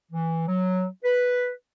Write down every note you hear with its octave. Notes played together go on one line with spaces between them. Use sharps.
E3
F#3
B4